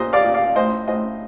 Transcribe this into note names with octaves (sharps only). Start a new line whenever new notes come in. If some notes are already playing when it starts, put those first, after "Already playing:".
Already playing: A#2 C5 D#5
D5 F5
A#2
D5 F5
A2 C5 D#5
A2 C5 D#5